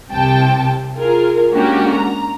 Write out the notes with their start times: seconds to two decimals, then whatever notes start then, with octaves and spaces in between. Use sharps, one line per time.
0.11 C2 C3 G5 A5
0.96 F4 G#4 A#4
1.52 G#3 A#3 C#4 D4 F#4 G4
1.90 A#5